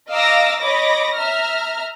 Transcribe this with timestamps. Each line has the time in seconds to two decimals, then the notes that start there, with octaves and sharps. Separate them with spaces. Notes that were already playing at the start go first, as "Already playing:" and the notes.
0.11 D#5 F5 A#5 D6 E6 A#6
0.60 C#5 D#5 B5 D6 A#6
1.16 E5 A#5 F6